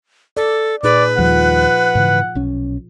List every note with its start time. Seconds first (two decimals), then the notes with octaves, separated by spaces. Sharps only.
0.37 A4 D5
0.83 A#2 D#4 G#4 B4 D5
1.18 D#2 D#3 F3 G3 F#5
1.95 G#2 C#3 E3
2.35 B1 C#4